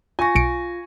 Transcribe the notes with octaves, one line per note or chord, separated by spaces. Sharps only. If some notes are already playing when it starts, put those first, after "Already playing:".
F4 G#5 C#6 A#6
B1 C#7 D7